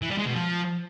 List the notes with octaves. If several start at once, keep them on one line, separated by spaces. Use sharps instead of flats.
E3
G3
G#3
B2
F3